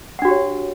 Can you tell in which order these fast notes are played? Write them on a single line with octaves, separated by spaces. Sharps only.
F#5 D4 F#4 G4 C#5